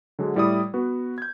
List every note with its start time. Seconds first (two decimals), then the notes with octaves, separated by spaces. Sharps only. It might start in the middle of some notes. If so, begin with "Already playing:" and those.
0.19 D3 F#3 G#3
0.36 A2 G3 E4 D5 D6 D#6
0.74 B3 F#4 B4
1.18 G6 G#6